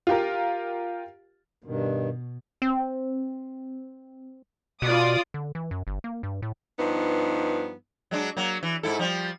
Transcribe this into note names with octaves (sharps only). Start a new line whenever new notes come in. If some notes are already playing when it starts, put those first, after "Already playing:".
F4 G4 A#4
G2 B2 D#3
C4
B2 F4 D5 D#6
D3
E3
F#2
G1
A#3
G2
A2
G2 F3 B3 D#4
F#3 G#3 D4
F#3 A#3
E3
G#2 E4 A4
F3 G3